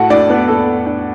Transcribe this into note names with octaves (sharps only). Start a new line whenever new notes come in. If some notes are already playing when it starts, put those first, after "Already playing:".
Already playing: A2 F#4 A4 F#5 A5
A2 D4 D5
B3 B4
A2 A4
D4